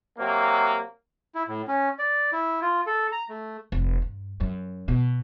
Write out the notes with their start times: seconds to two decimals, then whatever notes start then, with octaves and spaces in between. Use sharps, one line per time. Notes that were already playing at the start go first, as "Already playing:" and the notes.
0.18 C3 F#3 A#3
1.35 E4
1.48 A2
1.68 C#4
1.99 D5
2.32 E4
2.61 F4
2.87 A4
3.12 A#5
3.29 A3
3.72 F1
4.02 G2
4.40 F#2
4.88 B2